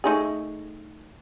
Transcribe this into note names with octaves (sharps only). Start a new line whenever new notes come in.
A3 D#4 G#4